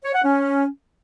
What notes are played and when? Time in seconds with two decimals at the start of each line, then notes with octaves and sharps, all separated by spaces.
0.05 C#5
0.14 F#5
0.24 C#4